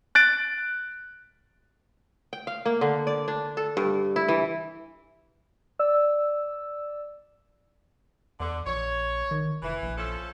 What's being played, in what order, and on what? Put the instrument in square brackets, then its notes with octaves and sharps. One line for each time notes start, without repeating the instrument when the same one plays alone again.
[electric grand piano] F#6 A6 D7
[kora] G5
F5
A#3
D3
D5
D4
A4
G2
E4
E3
[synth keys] D5 E6
[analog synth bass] E2 [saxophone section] D3
[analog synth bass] A#1 [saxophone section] C#5
[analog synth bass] D#3
[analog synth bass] F1 [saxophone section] E3
[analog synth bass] A#1
[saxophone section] F3 C#4 A4